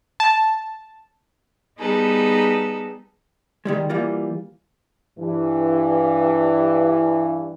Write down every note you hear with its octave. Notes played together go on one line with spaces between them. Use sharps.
A5
G3 B3 D#4 G#4 A4 B4
D#3 G3 G#3
E3 G3 A#3 F4
G2 E3